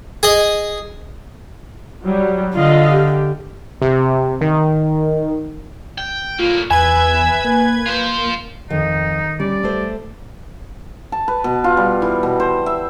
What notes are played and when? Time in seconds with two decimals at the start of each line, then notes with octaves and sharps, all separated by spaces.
0.23 G#4 D#5
2.04 F#3 G3
2.55 D3 F4 D#5 F5
2.89 G4
3.81 C3
4.41 D#3
5.98 G5
6.39 A2 A#3 F4
6.71 E2 B4 E5 G#5 G#6
7.44 A#3
7.86 F4 C5
8.70 F2 D#3 D#4
9.40 G3 C#4 D5
9.63 A3 C5
11.12 A5
11.28 B4
11.44 B2
11.64 F4
11.77 G3
12.02 E3
12.23 B2
12.40 C5
12.66 E5